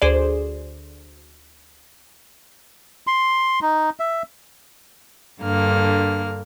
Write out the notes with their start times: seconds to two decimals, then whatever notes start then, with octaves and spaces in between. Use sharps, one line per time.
0.02 D2 G#4 C5 D5
3.07 C6
3.62 D#4
4.00 E5
5.41 G2 D3 A#3 F6